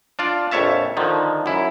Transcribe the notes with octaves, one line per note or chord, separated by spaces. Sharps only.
D4 F4 D5
A#1 F2 C#5 E5 A5
D3 D#3 F3
F#2 E4